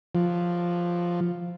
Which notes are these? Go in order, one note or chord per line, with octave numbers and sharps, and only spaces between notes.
F3